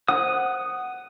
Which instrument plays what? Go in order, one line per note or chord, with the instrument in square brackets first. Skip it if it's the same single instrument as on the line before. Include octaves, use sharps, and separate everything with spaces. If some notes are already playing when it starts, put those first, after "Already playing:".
[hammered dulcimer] F#5 [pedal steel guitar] D#6